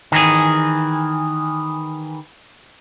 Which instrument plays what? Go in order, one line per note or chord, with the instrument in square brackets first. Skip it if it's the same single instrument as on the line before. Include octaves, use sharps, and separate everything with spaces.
[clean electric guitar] D#3 E3 G#4